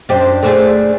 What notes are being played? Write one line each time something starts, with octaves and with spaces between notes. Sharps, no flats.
F#2 D4 G4 C5 D#5
A3 D4 G#4 C5